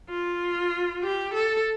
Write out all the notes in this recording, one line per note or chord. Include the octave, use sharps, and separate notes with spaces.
F4
G4
A4